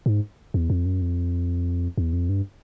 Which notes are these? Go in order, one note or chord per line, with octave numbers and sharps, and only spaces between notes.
G#2
E2
F2
F#2
F2
E2
F2
G2